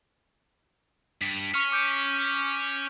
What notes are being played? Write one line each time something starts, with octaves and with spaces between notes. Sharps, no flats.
G2 B6
C#4 C#6 F6
D6 G6 D7